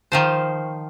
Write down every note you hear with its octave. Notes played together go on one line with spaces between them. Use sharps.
D#3 F3 C5